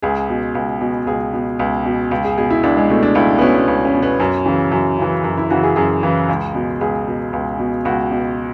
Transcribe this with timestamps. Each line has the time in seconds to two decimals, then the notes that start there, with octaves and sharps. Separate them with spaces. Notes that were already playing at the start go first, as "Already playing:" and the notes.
0.02 C#2 G#4
0.29 B2
0.55 C#2
0.81 B2
1.07 C#2 G#4
1.33 B2
1.59 C#2
1.85 B2
2.11 C#2
2.25 G#4
2.37 B2 G#4
2.50 E4
2.63 C#2 D4
2.77 G#3
2.90 B2 A3
3.03 D4
3.15 C#2 E4
3.29 D4
3.38 B3
3.42 B2 C#4
3.54 B3
3.68 C#2
3.85 C#4
3.94 B2
4.02 B3
4.20 F#2 C#4
4.46 C#3 E3
4.72 F#2
4.98 C#3 E3
5.24 F#2
5.37 E4
5.50 C#3 E3 F#4
5.63 G#4
5.76 F#2 G#4
6.03 C#3 E3
6.29 C#2
6.55 B2
6.81 C#2 G#4
7.07 B2
7.33 C#2
7.59 B2
7.85 C#2 F#4
8.11 B2